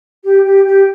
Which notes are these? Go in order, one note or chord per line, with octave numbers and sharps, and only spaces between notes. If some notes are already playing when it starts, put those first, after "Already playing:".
G4
G4
G4